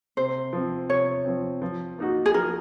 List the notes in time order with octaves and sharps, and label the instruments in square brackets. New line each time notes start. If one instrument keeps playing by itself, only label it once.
[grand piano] C3 [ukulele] C5
[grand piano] F3 C4
[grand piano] C3 [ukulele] C#5
[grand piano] F3 C4
F3
A#3 D#4 F#4
[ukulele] G#4
[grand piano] F3 [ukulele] A#4